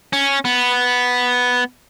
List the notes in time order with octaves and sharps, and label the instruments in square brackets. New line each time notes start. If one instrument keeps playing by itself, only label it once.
[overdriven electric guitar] C#4
B3